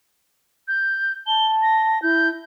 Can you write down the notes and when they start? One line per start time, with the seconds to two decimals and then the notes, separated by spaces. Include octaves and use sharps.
0.68 G6
1.27 A5 G7
1.62 A#6
2.02 E4 G6